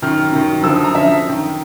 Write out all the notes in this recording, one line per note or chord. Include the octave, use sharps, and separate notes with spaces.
F#2 D#3 F6
F#2 D#3
F#2 D3 F3 E6
D#6
A#5
F#2 D3 F3 E5
F#2 D#3